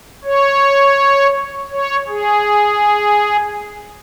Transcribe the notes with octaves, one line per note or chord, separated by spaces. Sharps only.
C#5
C#5
G#4